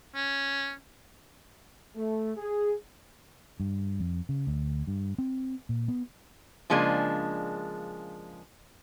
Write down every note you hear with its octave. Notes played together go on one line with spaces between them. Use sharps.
C#4
A3
G#4
G2
F2
C#3
D2
G2
C4
A#2
B3
C#3 F3 G#3 A#3 D4